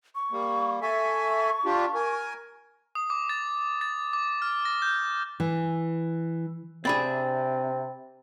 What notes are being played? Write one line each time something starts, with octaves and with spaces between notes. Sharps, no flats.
C#6
G3 A#3
A4 E5 G#5 C#6
D4 F4 G4
A#4 G#5
D#6
D6
A6
A6
D6
F6
A#6
G6
E3
C3 C4 D4 G#4 B5 A6